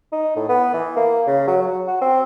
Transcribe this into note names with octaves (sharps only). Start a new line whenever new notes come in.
D#4
A2
B3
E3
A#3
C#3
F#3
F#3
F#4
C4